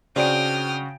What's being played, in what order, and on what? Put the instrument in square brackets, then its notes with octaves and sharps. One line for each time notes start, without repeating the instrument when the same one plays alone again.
[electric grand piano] C#3 F#4 D7 [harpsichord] C4 D4 [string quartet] G5 D#6 F6